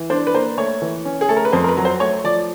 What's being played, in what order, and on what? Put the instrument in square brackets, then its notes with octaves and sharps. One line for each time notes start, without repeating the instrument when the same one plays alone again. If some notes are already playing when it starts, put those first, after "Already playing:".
Already playing: [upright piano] E3
D4 C5
B4
A#3 C5
A3 C#5
E3
C#4
G#4
A3 A4
A#4
B4
F2 C5
A#4
B4
F#3
C5
A3 C#5
F3 D5